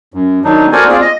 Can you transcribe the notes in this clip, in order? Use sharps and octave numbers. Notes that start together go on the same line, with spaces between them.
F#2
D#3 F#3 D4 D#4
F#4 A4 A#4 C5 D5 G#5
C4 F4 G#4 D5
D#5